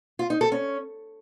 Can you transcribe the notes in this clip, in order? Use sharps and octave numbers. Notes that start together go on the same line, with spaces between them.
F4
D#4
A4
C#4